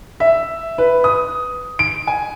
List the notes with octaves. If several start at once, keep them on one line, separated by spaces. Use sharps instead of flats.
E5
B4
D#6
D7
G#5